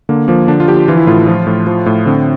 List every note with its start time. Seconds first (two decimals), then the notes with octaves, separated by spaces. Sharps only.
0.09 D3 A#3
0.28 F3 A#3
0.48 D3 D4
0.60 F4
0.68 F3 G4
0.88 E3 F4
0.97 E4
1.07 A2 F4
1.27 F3
1.47 A2
1.67 F3
1.86 A2
2.06 D3 C4